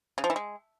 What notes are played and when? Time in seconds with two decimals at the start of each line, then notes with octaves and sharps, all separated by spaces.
0.18 C#3
0.24 F3
0.30 E3
0.36 G#3